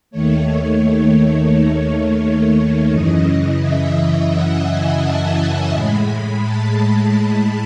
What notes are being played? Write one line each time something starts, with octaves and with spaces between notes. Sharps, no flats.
D#2 D#3 A3 C#5
F#2 C#3 E3 D#5
E5
F#5
G#5
A5
A2 G#3 B5
A5